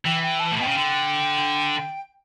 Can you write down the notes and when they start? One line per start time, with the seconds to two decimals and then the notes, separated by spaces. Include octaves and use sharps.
0.05 E3 G5
0.23 G5
0.40 A5
0.52 A2
0.58 B2 A5
0.62 C#3 G5
0.76 D3